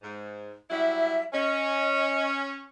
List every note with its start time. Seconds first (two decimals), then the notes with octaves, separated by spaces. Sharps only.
0.03 G#2
0.71 F#3 G3 E4 E5
1.33 C#4 D#5